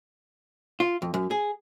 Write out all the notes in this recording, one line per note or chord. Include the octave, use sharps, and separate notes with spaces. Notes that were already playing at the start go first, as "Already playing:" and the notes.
F4
F2
F#2
G#4